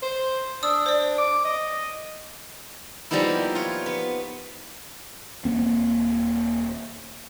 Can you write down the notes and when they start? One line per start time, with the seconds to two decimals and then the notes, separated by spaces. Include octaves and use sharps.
0.02 C5
0.63 D4 D#6 E6
0.86 C5 D5
1.18 D6
1.45 D#5
3.11 F3 G3 A#3 B3 D#4 E4
3.55 F4 C#5
3.86 B3
5.45 D#1 F2 A#3 C4